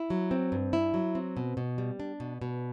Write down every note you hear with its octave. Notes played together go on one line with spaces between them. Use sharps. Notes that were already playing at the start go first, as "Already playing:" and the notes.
Already playing: E4
F#3
C4
G2
E4
F#3
C4
B2
B2
G3
D4
B2
B2